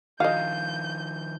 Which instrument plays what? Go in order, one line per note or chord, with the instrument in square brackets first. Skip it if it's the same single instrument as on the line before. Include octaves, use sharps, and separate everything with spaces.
[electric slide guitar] D#3 F3 [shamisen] F#4 D#5 [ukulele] F5 [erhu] G6